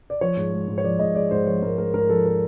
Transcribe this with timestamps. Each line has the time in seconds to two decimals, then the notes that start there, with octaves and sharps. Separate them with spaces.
0.10 D5
0.21 F3 C#5
0.37 G#2
0.52 G#3
0.68 G#2
0.78 C#5
0.84 F3 D5
0.99 G#2 D#5
1.15 G#3 D5
1.31 G#2 C5
1.47 F3 C#5
1.62 G#2 A#4
1.78 G#3 A#4
1.94 G#2 A#4
2.09 F3 A4
2.25 A#4